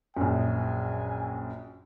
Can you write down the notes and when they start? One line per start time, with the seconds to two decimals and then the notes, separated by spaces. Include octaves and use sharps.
0.17 A#1 F#2 G#5